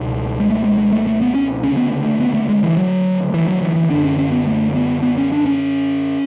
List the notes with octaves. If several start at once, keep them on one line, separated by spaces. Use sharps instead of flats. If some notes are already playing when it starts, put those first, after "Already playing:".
Already playing: C#2 B2
G#3
A3
G#3
G#3
A3
A3
B3
C#4
D2 C#3 C#4
B3
A3
B3
A3
G#3
E3
F#3
E3
F#3
E3
E3
F#2 D3 D4
C#4
C#4
B3
A3
B3
B3
C#4
D4
C#4